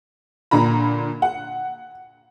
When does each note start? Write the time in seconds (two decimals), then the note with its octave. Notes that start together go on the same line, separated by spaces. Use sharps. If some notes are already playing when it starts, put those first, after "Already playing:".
0.51 A#2 D3 A#5 B5
1.22 F#5